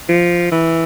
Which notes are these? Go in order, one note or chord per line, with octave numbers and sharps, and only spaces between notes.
F3
E3